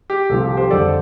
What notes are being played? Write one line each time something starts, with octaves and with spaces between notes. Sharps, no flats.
G4
C2 C3 F3 C4 A4
G4
G4 C5
F2 D3 G3 A4 D5